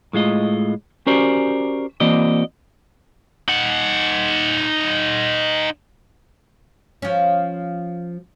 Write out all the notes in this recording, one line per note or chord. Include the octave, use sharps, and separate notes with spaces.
A2 G#3 F4 D#5
C#4 F#4 G4 A#4 C5 D5
E3 A#3 C4 F#4 D5 D#5
D#4 F#5
F3 C#4